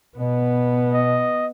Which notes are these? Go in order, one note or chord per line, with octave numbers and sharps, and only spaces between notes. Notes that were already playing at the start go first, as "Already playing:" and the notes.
B2 B3
D#5